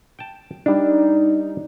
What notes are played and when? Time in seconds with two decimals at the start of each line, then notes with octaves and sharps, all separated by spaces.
0.19 G5 A5
0.66 G3 D4 D#4